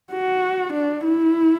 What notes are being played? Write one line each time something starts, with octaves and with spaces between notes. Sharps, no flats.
F#4
D4
E4